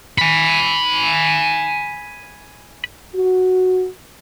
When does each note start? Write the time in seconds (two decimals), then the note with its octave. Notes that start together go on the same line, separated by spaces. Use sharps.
0.18 G#5 B5
3.15 F#4